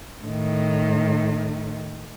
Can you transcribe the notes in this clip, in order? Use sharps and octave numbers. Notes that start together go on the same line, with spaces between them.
A2 D#3